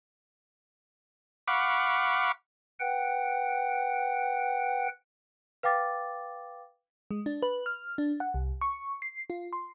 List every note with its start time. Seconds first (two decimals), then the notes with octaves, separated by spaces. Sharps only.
1.48 F5 F#5 B5 C#6 D6
2.80 B4 F#5 G5
5.63 B4 F5 G5 D6 A6
7.11 G#3
7.26 D4
7.42 B4
7.66 F6
7.98 D4
8.20 F#5
8.34 C2
8.61 C#6
9.02 C7
9.30 F4
9.53 C6